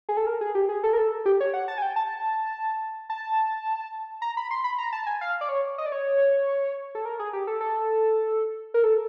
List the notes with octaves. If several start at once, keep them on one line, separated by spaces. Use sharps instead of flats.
G#4
A4
A#4
G#4
G4
G#4
A4
A#4
A4
G4
C#5
F#5
A5
G#5
G5
A5
A5
A#5
B5
C6
B5
A#5
A5
G#5
F5
D5
C#5
D#5
D5
C#5
A4
A#4
G#4
G4
A4
A4
A#4
A4